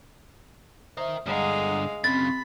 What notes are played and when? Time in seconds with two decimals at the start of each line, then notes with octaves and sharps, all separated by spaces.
0.97 A#4 C5 D#5 E5 D#6
1.26 G2 D3 G#3 F5 F#5 A#5 D#6
2.04 F#2 C#3 C4 B5 A6